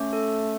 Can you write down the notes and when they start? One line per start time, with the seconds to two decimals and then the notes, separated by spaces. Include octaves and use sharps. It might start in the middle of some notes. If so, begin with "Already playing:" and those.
Already playing: A3 C#4
0.13 A4